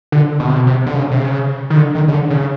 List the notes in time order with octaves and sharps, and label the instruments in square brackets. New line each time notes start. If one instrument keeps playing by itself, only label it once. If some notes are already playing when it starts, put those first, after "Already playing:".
[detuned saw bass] D3
B2
C3
B2
C3
D3
C#3
C3
C#3
D#3
D3
D#3
C#3
D3
C#3